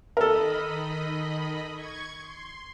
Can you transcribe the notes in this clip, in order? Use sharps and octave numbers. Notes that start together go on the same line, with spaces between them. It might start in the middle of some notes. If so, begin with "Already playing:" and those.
D#3 A4 A#4 D#5 B5
C#6 G#6
C6